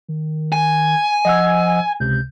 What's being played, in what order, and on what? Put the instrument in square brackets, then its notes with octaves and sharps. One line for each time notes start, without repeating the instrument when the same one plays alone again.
[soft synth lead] D#3
[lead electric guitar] G#5
[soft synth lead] F3 [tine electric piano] D#5 F#5 E6
[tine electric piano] C#2 C3 [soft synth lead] G6